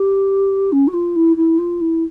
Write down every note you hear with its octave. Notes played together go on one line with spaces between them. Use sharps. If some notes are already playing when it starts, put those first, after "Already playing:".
Already playing: G4
C#4
F#4
F4
E4
E4
F4
E4